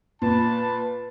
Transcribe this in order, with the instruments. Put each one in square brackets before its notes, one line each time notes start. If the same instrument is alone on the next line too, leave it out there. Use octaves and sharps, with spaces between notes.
[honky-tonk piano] A#2 [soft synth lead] B4 [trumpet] A5